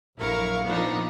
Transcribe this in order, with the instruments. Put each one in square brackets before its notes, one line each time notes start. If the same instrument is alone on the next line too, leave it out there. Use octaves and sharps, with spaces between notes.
[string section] A#1 F#2 E4 A#4 F5 C#6
A#2 F3 B3 D4 D#4